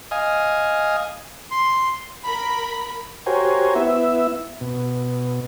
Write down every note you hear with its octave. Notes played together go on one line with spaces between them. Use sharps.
D#5 F5 G#5
C6
A#4 B5
F#4 G4 A#4 C5 C#5 G#5
B3 E4 E5
B2